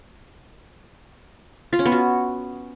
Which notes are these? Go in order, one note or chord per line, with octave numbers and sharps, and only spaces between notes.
F4
C#4
B3
F#4